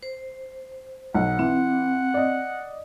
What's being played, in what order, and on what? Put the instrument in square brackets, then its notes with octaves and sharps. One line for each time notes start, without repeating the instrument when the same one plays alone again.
[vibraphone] C5
[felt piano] B1 [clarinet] F#5
[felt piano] E3 [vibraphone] C4
[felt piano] D5 D#5